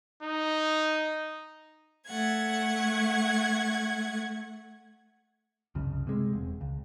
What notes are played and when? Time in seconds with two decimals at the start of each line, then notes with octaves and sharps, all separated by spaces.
0.23 D#4
2.07 A3 F#5 G#6
5.75 C2 F#2 C#3
6.07 C3 G#3
6.33 E1
6.61 C#2